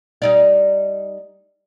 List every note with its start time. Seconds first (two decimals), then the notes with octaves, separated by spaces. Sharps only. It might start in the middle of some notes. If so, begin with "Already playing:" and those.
0.22 G3 D#4 D5